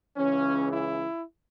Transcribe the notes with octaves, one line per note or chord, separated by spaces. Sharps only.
C#2 C#3 E3 C#4
E4